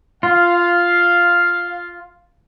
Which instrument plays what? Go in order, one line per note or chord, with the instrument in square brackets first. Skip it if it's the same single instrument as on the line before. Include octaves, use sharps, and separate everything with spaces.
[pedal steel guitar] F4 [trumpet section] F5